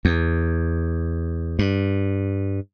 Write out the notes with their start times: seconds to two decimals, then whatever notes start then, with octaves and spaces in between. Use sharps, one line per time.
0.05 E2
1.59 G2